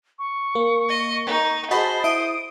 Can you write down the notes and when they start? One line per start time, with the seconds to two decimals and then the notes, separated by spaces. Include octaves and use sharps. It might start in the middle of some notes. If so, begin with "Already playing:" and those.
0.19 C#6
0.55 A#3
0.89 D#5
1.26 D#4
1.71 F#4 G#4 C5 D#5 A5 B5
2.04 E4 D#6 D7